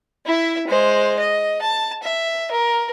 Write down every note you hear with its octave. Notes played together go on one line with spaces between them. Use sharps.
E4 E5
G#3 C5
D#5
A5
E5
A#4